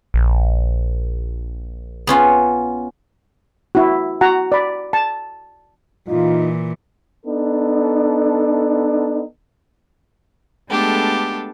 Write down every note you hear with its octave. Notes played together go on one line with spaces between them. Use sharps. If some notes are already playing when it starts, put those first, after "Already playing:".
A#1
B3 C#4 F4
E4 F#4
F#4 F#5 A#5
D5 B5
A5
A#2 E3 D#4 F4
B3 D4 D#4 A4
G#3 A3 B3 D4 G4 A4